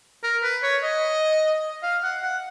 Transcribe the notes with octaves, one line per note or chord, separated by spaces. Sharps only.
A#4
B4
C#5
D#5
F5
F#5
F#5